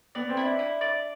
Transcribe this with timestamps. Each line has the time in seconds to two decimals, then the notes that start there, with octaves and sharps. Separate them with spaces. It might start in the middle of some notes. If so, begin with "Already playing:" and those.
0.15 B3 D5
0.29 C4
0.37 E4
0.44 D4
0.59 E4
0.81 D5